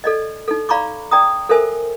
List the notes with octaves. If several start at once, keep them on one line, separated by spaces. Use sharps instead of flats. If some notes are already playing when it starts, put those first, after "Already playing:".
A4 D5 D#5
D#4 A4
D5 F5 A#5 B5 C#6 D6
D5 G5 A#5 D#6
A4 A#4 C5 E5 G#5